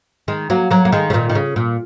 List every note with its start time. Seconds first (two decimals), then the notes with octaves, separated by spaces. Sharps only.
0.28 D#3 G#3
0.50 F#3 A#3
0.71 F#3 A#3
0.85 A#3
0.92 D#3 G#3
1.10 C#3
1.13 A#2 D#3
1.30 D#3
1.35 C#3
1.56 A#2